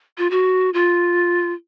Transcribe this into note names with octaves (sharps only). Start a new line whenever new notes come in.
F4
F#4
F4